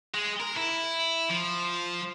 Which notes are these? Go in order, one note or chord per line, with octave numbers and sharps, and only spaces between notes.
G#3
A#4
E4
F3